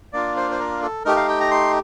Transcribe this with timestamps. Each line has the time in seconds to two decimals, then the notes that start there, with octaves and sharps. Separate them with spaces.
0.13 A#3 D4 F4 D5
0.36 C5
0.51 C5
0.59 A#4
0.82 A4
1.05 A3 D#4 G4 A#4
1.16 F5
1.29 G5
1.40 A#5
1.51 C6